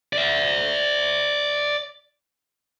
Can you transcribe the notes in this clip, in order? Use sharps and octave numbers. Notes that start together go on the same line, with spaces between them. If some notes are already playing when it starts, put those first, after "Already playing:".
D5 E5